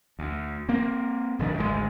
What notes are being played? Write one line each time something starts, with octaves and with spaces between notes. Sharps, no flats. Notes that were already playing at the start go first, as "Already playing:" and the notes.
D2
A#3 C4
D#1 A#1 D#3 D4
G#1 D2 C3 G#3